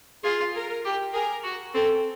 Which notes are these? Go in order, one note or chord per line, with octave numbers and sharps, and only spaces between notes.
F4 G#4
A#4
G4
G#4 A#4
F#4
C4 A4